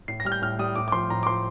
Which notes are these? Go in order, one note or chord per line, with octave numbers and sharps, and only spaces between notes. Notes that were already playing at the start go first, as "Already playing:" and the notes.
A2 C7
A#6
G3 F6
G6
A2 F6
G3 D#6
A2 D6
D6
F3 C6
A2 A#5
D6
F3 C6